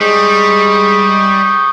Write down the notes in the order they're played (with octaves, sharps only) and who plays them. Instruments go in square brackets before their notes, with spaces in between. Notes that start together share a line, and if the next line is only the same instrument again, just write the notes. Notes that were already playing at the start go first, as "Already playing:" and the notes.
[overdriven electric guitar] G3 [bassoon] G#3 [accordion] C#6 D#6 G6